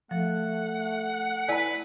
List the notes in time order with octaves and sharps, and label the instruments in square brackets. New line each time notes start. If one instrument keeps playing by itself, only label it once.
[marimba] F3 [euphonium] A3 [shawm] F#5
[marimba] E4 G#5 [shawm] B4 [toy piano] D5 A5